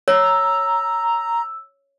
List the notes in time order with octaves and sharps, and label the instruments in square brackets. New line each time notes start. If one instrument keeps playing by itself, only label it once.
[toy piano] C#5 [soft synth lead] A#5 [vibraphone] E6